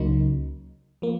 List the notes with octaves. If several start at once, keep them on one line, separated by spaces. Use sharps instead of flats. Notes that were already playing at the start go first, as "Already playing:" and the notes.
Already playing: C#2 C#3 F#3 A#3 D#4
F3 A#3